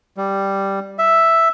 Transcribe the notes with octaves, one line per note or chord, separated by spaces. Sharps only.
G3
E5